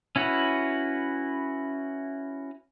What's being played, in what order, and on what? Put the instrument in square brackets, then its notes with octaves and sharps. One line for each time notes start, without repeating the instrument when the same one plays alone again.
[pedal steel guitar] C#4 E4 F#4 B4